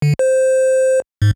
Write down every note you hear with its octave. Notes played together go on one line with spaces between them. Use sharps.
D3
C5
G#2